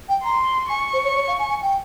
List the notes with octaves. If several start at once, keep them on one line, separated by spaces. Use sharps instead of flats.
G5
A#5 C6
G#5 C#6
C5
C#5
C#5
F5
G#5
G#5
G5